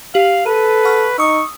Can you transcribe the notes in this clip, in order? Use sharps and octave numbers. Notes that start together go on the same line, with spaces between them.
G4 F5 F#7
A4 B4 D#7
F#5 C#6 F6
D#4 C#6 D#6 E6